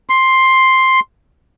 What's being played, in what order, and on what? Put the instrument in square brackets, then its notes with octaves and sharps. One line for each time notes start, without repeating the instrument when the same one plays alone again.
[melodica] C6